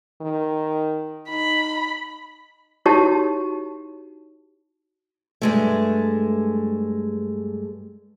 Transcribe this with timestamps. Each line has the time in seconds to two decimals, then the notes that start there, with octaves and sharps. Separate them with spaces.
0.21 D#3
1.29 D#4 B5
2.86 D#4 E4 F#4 G4 C#5 A5
5.42 G2 G#3 A3